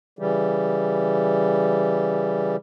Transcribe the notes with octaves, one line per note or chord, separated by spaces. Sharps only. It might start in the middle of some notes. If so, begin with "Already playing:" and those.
C#3 E3 G3